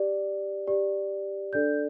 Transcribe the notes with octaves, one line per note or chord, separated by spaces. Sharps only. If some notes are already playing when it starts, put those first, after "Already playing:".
Already playing: G4 D5
G4 D5
D4 A4 D5 G6